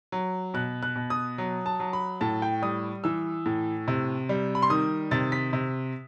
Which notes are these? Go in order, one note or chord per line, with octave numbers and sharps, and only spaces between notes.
F#3
B2 F#6
F#6
B2
D#6
F#3
A5
F#3
B5
A2 A5
G5
G3 D#6
E3 E6
A2
C3
G3
B5
C6
D#3 D#6
C3 A6
B6
C3